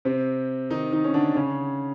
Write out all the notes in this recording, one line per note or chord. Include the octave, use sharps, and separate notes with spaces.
C3 C4
D#3 D#4
D#3 D#4
C#4
D3 D4
C#3 C#4